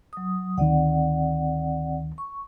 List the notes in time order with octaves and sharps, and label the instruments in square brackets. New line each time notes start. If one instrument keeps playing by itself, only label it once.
[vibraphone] F#3 D#6
[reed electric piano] D2 D#3 [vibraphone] C4 D5 F#5
[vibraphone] C#6